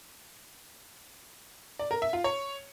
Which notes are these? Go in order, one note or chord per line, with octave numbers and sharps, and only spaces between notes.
D5
A#4
E5
F4
C#5